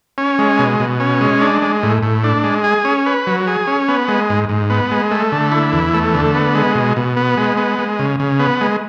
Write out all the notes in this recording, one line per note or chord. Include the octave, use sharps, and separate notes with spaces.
C#4
G#3
B2
B2
C#4
G#3
D4
G#3
A2
A2
D4
G#3
G#4
C#4
B4
F#3
G#4
C#4
B3
G#3
G#2
G#2
B3
G#3
A3
D3
E4
E2
A3
D3
B3
G#3
B2
B2
B3
G#3
B3
G#3
C#3
C#3
B3
G#3